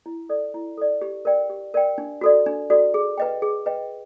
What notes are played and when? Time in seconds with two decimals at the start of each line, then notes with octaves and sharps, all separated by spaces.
0.06 E4
0.29 A4 D5
0.54 E4
0.77 A4 D5
1.01 G4
1.25 A#4 D5 G5
1.50 G4
1.74 A#4 D5 G5
1.98 D4
2.21 F#4 A4 D5
2.46 D4
2.70 F#4 A4 D5
2.94 G#4
3.18 B4 D#5 G5
3.42 G#4
3.66 B4 D#5 G5